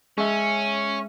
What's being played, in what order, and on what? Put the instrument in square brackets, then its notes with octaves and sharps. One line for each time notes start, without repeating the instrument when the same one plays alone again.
[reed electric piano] G#3 E5 [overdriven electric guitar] C#4